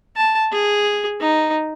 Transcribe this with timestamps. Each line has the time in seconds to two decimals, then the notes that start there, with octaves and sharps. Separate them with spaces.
0.17 A5
0.52 G#4
1.20 D#4